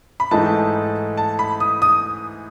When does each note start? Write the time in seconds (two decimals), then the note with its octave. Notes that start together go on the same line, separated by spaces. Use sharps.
0.20 B5
0.31 G#2 E3 A3 D#4 A5
1.17 A5
1.39 B5
1.60 D#6
1.82 D#6